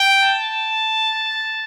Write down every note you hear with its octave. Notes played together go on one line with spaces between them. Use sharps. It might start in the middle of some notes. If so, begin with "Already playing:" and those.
Already playing: G5
A5